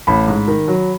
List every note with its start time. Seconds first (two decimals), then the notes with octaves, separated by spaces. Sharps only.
0.07 A1 B5
0.27 G#2
0.48 D#3
0.68 F#3